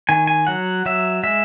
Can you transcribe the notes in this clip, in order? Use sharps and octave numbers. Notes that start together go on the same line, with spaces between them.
D#3 G#5
G#5
F#3 F#5
F#3 E5
G#3 E5